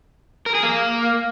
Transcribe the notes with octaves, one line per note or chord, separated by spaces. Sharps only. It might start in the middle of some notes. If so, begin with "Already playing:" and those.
A#4
G#4
A#3